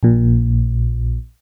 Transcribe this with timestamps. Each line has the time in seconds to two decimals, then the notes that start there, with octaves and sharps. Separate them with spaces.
0.03 A#1 A#2